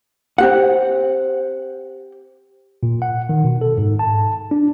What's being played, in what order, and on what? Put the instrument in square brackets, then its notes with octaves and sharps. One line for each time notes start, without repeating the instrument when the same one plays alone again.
[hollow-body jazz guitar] C4 G4 F#5
[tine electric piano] A#2
F#5
D#3
B2
A4
G#2
A5
D4